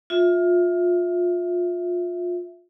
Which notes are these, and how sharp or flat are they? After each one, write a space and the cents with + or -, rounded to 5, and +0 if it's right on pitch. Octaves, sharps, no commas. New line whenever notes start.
F4 +20 E5 +0